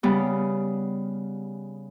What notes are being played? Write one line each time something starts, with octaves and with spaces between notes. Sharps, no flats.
C#3 G3 B3